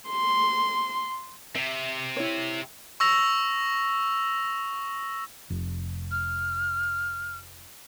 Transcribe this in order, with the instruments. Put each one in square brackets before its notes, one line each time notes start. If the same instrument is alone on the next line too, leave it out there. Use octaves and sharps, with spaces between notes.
[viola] C6
[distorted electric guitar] C3 [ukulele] E5
[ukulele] E4 C#5
[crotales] C#6 E6 A#6 F7
[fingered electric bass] F1
[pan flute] F6